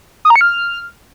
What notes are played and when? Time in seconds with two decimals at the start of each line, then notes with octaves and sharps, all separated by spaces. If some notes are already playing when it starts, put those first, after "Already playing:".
0.25 D#6
0.30 A#5
0.36 C#7
0.41 F6